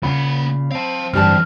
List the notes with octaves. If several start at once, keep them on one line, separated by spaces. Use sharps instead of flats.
A#2 C#3 A#3 F#5 B5
C4 F5 A5
G2 D3 E3 G3 A5 F6